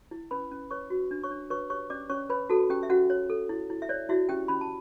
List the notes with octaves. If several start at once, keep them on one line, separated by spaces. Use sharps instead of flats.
E4
C#4 B4 B5
C#4
B4 C#5 C#6
F#4
D4
C#5 C#6
D4
B4 C#5 C#6
G4 C#5 C#6
C#4 D5 D6
C#4 C#5 C#6
B4 C#5 B5
F#4 A4 A5
C#4 G4 G5
E5
C#4 F#4 F#5
C#5
A4
E4
E4
E5
C#5 D5
E4 F#4 E5
C#4 G4 G5
C#4 B5
A5